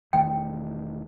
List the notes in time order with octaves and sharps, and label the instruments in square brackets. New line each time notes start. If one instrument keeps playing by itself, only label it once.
[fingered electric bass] E1 D#3 A3 [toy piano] G5